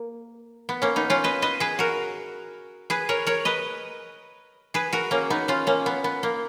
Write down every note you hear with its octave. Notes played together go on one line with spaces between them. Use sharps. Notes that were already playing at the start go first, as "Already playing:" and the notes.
Already playing: A#3
B3
A#3 C#4
B3 D#4
C#4 F4
B4 D#5
B4 D#5
G#4 B4
F#4 A#4
G#4 B4
A#4 C#5
A#4 C#5
B4 D#5
G#4 B4
F#4 A#4
A#3 C#4
B3 D#4
C#4 F4
A#3 C#4
B3
B3
A#3